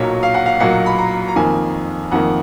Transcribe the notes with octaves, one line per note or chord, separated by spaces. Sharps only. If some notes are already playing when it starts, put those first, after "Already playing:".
Already playing: B1 A#2 F#3 A#3 C#5
F5
F#5
F5
B1 A#2 F#3 A#3 F#5
B5
A#5
A#5
F2 D#3 A#3 G#5
F2 D#3 A#3 F#5